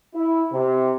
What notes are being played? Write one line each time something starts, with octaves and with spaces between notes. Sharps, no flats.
E4
C3